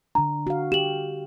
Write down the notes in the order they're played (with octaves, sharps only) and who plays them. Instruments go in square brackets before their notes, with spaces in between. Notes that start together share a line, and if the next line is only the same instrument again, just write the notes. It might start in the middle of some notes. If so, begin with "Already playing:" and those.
[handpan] D3 D4 [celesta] A#5
[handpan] F#4 F5
[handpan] G4 [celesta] E7 F#7